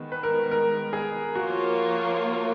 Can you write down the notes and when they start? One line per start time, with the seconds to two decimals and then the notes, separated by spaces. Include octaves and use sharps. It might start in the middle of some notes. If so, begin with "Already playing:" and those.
Already playing: D#3 G#3 B3
0.12 B4
0.23 A#4
0.51 A#4
0.93 G#4
1.35 F3 A#3 F4 F#4 A#4 C#5